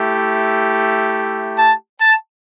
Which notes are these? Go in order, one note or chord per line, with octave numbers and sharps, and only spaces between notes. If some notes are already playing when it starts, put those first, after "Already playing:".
Already playing: A3 E4 G4
A5
A5